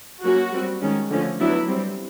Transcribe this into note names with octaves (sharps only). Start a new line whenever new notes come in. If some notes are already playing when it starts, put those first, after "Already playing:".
F#3 A#3 C#4 F#4
G3 C4
D#3 G#3 C#4
D3 F3 A3 C#4
F#3 B3 D4 E4
G3 C4